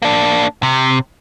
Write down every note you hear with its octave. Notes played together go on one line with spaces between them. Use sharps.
A#3 D4
C3